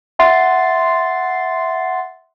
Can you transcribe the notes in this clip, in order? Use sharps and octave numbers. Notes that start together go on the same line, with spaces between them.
E5 F#5 C6 A6 C7